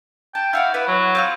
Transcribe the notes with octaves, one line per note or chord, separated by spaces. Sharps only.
G5 A5
E4 F#4 D5 F5
B3 E4 B4
F#3
C4 F4 F6